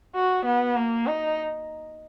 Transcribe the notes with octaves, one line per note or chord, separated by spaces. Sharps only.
F#4
B3
A#3
D#4